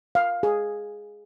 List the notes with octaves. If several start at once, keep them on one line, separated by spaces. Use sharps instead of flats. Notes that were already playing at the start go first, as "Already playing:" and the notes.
F5
G#4